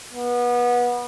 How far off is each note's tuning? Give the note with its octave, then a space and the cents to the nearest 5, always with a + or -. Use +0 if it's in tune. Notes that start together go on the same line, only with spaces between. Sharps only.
B3 -25